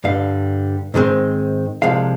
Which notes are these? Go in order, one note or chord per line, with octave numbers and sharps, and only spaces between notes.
G2 D3 G3 F5
G#2 D#3 G#3 C4
C2 C3 F3 G#3 F5